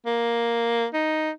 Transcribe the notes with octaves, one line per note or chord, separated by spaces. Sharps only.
A#3
D#4